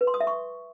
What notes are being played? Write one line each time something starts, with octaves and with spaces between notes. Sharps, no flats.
B4
C6
D#6
E5
C#6